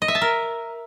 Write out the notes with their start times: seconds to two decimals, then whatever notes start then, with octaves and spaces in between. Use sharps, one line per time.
0.02 D#5
0.08 E5
0.15 A5
0.21 A#4